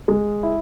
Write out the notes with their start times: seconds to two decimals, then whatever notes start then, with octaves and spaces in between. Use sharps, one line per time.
0.08 G#3
0.43 E4